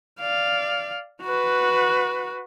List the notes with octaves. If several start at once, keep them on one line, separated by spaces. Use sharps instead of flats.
D5 F5
F#4 B4